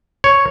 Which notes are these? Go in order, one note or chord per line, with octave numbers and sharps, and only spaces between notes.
C#5